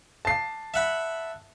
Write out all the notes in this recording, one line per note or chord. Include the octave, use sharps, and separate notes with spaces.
A5 C7
E5 F#5 B5